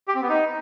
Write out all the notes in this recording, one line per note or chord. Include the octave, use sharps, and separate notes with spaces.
G4
C4
B3
D#4